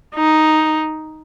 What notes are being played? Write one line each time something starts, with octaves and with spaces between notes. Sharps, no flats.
D#4